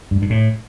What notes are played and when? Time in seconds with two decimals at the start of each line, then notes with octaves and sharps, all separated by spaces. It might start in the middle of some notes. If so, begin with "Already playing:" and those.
0.11 G2
0.22 G2
0.30 A2